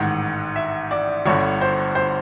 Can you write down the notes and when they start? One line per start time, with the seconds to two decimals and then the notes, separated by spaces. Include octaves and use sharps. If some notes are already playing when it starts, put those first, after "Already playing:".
Already playing: A1 G#2 D#3 F#5
0.56 E5
0.91 D5
1.26 G1 G2 D3 C#5
1.61 C5
1.95 C5